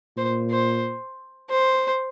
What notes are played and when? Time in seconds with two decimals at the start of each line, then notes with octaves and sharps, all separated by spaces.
0.17 A#2 C5
0.51 C5
1.50 C5